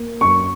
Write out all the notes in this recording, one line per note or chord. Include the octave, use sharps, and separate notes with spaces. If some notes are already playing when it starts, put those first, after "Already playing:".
Already playing: A#3
F#2 C#6